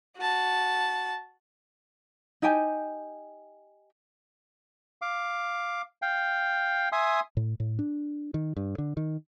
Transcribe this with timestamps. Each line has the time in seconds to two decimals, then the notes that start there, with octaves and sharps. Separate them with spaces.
0.17 F#4 A5
2.42 D#4 G4 G5 G#5
5.02 F5 D6
6.02 F5 G5
6.92 E5 G#5 C6 D#6
7.37 A2
7.60 A2
7.79 D4
8.34 D#3
8.57 G2
8.78 D3
8.97 D#3